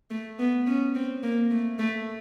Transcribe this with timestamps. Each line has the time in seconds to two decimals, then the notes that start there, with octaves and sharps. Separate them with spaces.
0.11 A3
0.39 B3
0.67 C#4
0.95 C4
1.23 A#3
1.51 A3
1.79 A3